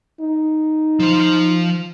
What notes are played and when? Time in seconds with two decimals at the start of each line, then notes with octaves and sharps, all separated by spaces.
0.21 D#4
1.00 F3 C5